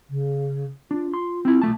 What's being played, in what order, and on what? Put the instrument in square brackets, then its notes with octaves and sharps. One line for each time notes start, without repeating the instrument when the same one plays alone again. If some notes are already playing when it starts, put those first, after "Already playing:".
[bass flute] C#3
[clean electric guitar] D4 [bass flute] F4
[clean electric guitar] C6
C4 E4
B1 A3 A5